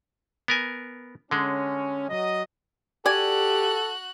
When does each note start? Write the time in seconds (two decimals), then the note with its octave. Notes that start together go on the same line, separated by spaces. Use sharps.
0.48 B3 A#4 G#5
1.31 D3 G#3 C#4
2.09 F#3 D#5
3.06 F#4 G4 A4 D5 G#5 F#6